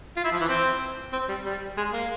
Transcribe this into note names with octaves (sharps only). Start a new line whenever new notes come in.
F4
E4
F3
E3
C4
C4
G3
G3
G#3
A#3